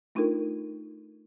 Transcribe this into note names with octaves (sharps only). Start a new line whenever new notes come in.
A3 D4 D#4 F4 A4 A#4